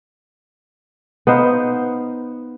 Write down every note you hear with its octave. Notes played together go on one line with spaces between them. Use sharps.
B3 D#4 C5 F5